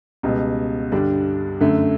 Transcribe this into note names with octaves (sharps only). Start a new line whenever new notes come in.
C#2 B2 G3
G2 D3 G3 D4
F#2 D3 A3